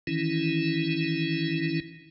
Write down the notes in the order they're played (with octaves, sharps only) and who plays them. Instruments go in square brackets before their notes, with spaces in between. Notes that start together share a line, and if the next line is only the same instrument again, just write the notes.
[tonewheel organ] D#3 E3 C#4 E4